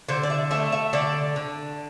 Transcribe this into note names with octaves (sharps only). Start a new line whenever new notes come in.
D3 C5
D5
E5
A3 E5
E5
D3 D5
D3